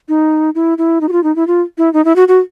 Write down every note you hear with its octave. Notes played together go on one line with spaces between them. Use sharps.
D#4
E4
E4
D#4
F#4
F4
D#4
E4
F4
E4
D#4
E4
F#4
F#4